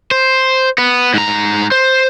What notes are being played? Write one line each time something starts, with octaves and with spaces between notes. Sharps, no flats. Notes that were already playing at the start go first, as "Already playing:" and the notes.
C5
B3
G#2 A#5
C5